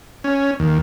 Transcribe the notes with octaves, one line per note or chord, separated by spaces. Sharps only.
C#4
D#2